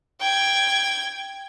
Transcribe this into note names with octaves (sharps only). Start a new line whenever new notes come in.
G5 G#6